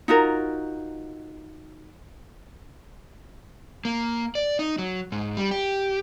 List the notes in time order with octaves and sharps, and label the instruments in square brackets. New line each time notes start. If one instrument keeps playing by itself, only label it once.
[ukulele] D#4 F4 F#4 A#4
[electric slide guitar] A#3
D5
D#4
F#3
G#2
G3
G4